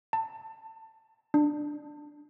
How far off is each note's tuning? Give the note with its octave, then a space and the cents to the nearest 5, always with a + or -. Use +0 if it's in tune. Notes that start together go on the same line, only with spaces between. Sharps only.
A5 +20
D4 +15